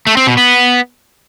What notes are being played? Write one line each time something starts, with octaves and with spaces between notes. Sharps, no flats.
A3
C4
B2
B3